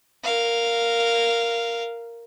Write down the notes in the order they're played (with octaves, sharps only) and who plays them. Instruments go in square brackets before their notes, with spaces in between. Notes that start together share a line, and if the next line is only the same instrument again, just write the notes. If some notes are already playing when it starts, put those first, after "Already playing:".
[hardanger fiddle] A#4 F5